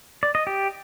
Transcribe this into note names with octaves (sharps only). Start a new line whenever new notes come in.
D5
D#5
G4